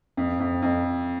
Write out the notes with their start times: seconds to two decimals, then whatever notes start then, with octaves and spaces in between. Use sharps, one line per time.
0.17 F2
0.40 F2
0.62 F2